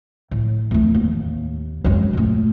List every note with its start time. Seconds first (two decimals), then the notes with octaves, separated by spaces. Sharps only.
0.31 A2
0.71 E2 A3
0.95 D#2
1.84 F#2 G#3
2.13 A#2 A3